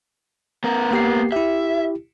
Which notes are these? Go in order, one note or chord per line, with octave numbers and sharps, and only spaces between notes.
B3 A#4
A#3 G4 C7
E4 G4 E5